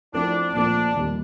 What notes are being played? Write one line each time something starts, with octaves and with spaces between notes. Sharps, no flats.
F3 A3 C4 D4 E4
A#2 F3 A3 C4 D4
D#2 D#3 G3